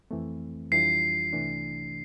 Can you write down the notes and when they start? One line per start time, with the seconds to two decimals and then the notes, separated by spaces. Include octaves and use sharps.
0.11 F2 E3 A3 C4
0.71 F2 E3 G3 D4 F4 C7
1.33 C2 C3 E3 A3 D4